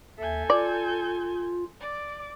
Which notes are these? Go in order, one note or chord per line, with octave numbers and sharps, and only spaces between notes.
D#2 A4 E5 G#5 G6
F4 D5
D5 D6